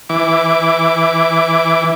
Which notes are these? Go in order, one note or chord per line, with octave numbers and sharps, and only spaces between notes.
E3 D6